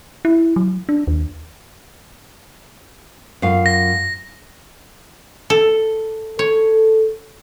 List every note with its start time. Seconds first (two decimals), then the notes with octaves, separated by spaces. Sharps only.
0.25 E4
0.56 F#3
0.89 D4
1.07 D#2
3.42 F#2 F4 F5
3.66 A#6
5.50 A4
6.39 A4 C#5